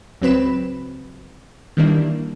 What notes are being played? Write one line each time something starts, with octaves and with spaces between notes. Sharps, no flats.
C#2 F#3 C4 B4 B5 E7
D#3 E3 G3 A#3 D4 E4